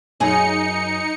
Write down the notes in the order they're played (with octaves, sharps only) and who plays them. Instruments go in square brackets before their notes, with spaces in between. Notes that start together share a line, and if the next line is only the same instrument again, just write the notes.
[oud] F#2 G#4 [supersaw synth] D#4 C#7